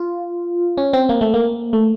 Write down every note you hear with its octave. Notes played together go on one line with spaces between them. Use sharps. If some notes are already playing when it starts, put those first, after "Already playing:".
Already playing: F4
C#4
C4
A#3
A3
A#3
A3